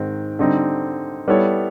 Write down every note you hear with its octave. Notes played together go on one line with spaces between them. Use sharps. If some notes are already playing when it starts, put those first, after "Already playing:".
Already playing: G#2 D#3 C4
D3 G3 C4 D#4
G3 B3 E4 A4 C#5